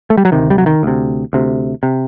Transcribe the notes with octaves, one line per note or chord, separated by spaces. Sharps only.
A3
G3
F#3
D2 C3 D#3
G3
F#3
D#3
D2 C3
D2 C3
C3